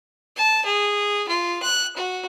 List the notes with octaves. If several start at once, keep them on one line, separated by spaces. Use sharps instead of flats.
A5
G#4
F4
F#6
F#4